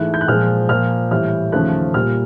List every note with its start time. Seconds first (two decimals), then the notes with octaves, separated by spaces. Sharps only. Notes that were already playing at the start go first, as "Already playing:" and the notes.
Already playing: G#2 E3 A3 F#6
0.14 G6
0.21 F#6
0.28 A#2 F3 G#3 F6
0.69 A#2 F3 A#3 F6
1.11 A2 E3 G3 F6
1.52 D#2 C#3 F3 A3 F#6
1.94 A#2 G3 A#3 F6